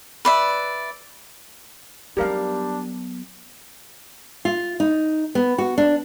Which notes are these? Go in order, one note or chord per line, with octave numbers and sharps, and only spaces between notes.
B4 D5 E5
F#3 G3 B3 D4 G4 A#4 F5
F4
D#4
B3
F#4
D4